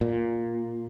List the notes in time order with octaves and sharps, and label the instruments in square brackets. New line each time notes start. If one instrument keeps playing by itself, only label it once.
[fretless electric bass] A#2